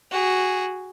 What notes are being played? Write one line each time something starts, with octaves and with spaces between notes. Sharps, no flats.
F#4 G#4